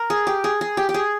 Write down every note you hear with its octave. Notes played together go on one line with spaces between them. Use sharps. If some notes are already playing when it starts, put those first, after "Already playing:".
Already playing: A#4
G#4
G4
G#4
G#4
G4
G4
G#4